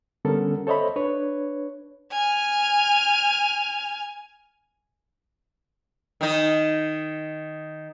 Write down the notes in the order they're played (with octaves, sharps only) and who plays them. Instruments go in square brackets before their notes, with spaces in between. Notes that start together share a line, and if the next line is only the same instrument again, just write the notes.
[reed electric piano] D3 G3 B3 C#4 A4 A#4
A4 C5 C#5 D#5 E5 B5
D4 B4 C#5
[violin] G#5 F6
[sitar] D#3 D#4